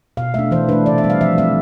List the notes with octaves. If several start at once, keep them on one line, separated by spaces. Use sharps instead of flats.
B2 F5
A3 D4 E5
E3 C5
A3 D4 B4
C3 D5
E5
G3 C4
F5
F3 E5
A3 C4 E5